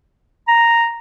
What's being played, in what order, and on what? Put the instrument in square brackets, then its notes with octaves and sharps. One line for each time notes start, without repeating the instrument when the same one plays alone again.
[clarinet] A#5